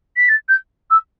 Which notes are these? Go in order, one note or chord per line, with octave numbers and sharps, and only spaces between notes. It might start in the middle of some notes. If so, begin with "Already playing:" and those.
B6
A6
G6
E6